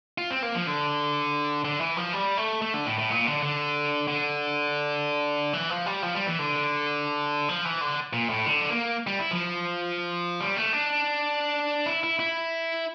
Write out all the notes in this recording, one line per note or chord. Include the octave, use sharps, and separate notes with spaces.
F4
C4
A#3
F3
D3
D3
E3
F3
G3
A3
A3
D3
A2
A2
A#2
D3
D3
D3
E3
F3
G3
F3
G3
E3
D3
F3
E3
D3
A#2
A2
D3
A#3
G3
E4
F3
G3
A3
D4
E4
E4
E4